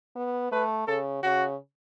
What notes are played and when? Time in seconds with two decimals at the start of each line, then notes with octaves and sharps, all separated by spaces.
0.16 B3
0.52 A3 B4
0.88 C#3 A4
1.23 C#3 F#4